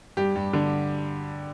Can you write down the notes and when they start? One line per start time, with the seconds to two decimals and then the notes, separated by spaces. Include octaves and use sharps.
0.17 G2 G4
0.36 G2
0.53 D3